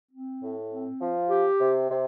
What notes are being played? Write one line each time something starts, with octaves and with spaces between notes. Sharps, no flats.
C4
A2
C4
F3
G4
C3
C3